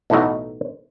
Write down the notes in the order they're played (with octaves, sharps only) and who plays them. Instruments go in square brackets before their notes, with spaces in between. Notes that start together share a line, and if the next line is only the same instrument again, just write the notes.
[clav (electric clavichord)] B1 A2 E3 A3 D#4 F#4